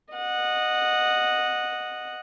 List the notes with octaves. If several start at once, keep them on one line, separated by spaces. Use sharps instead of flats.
D#5 F#5